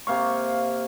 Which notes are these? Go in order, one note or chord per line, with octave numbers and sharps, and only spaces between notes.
C3 A#3 F5 C#6